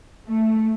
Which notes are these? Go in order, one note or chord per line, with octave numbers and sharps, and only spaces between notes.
A3